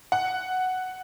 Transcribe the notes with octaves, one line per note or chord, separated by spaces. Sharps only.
F#5